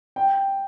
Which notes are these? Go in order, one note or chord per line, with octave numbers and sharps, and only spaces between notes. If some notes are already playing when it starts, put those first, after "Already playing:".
G5